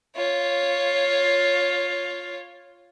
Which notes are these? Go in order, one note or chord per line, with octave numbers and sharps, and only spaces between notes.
F4 C#5